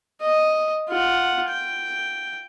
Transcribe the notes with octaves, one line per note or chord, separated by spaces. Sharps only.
D#5
F4 F#5
G5